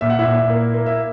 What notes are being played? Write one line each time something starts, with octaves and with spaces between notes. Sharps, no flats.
A#2 E5
F#5
E4 E5
A#2
A#3
A#3
E5